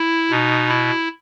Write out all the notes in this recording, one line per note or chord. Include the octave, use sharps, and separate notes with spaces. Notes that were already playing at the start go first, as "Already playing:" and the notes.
Already playing: E4
B2 D#4
E4